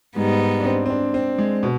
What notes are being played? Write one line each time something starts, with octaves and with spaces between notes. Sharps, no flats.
G#2 G3 G#3 B3 D#4
D4
C4
C4
D4
C4
G#3
B2